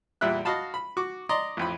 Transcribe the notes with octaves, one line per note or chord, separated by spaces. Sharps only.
E2 A#2 G3 E4 E5 F#6
F#4 D#5 F5 A5 B5
B5
F#4 C#6 D6
D5 D#5 A#5 C6 D6
A1 F2 B5